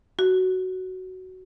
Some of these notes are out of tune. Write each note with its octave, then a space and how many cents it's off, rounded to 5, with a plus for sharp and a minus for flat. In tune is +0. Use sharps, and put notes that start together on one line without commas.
F#4 +10